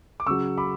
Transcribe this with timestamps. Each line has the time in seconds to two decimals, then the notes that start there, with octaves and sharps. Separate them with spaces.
0.20 D6
0.26 C#3 F#3 C#6 E6
0.58 B5 D6